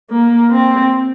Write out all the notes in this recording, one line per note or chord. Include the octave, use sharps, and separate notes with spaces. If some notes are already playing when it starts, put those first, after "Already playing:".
A#3
C4